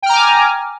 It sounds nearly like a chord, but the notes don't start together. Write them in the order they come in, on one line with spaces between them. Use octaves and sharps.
G5 F6 A#5 D6 G#5